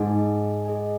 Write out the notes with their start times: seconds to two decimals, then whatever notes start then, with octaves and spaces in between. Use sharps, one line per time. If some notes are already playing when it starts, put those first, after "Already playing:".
Already playing: G#2 D#4 G#4 D#5 G#5
0.65 G#4 D#5 G#5